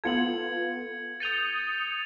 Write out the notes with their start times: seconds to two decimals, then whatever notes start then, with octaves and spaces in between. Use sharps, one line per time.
0.04 B3 F4 A4 G#6 C#7 F#7
1.20 D#6 G6 A6 C#7 D#7 F7